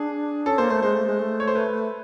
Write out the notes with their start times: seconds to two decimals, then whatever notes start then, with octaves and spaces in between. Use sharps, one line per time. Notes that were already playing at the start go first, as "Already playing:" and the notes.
Already playing: D4 G#4
0.46 C#4 A4
0.58 A#3 C5
0.70 A3 C5
0.82 G#3 C5
0.95 A3
1.07 G#3
1.19 A3
1.40 C#5
1.47 C5
1.55 B4